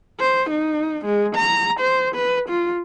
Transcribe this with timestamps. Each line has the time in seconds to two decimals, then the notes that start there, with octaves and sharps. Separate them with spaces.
0.20 C5
0.50 D#4
1.05 G#3
1.35 A#5
1.80 C5
2.15 B4
2.49 F4